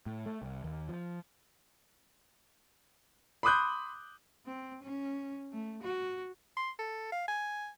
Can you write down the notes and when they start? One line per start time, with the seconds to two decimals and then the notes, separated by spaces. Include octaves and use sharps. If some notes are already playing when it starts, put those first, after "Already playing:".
0.06 A2
0.26 A3
0.42 C2
0.64 D#2
0.89 F3
3.43 B5 C6 D6 D#6 F#6 G6
4.46 C4
4.83 C#4
5.52 A3
5.83 F#4
6.57 C6
6.79 A4
7.12 F5
7.28 G#5